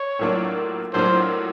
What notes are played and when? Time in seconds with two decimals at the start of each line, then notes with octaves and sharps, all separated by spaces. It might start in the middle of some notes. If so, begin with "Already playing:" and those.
Already playing: C#5
0.19 A2 F#3 A#3 D4 F4
0.94 A2 F#3 A#3 D4 F4 C5